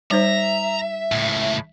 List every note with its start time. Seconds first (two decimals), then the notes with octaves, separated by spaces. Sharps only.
0.11 G3 D#4 C5 E5 A#5
1.12 C#2 A2